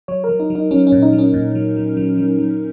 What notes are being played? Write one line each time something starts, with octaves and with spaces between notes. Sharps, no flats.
F#3 C#5
A#4
F#3
D#4
F#3
D#4
F#3 C#4
C#4
A#2
D#4
F#3
C#4
A#2
F#3
F#3
F#3
F#3
F#3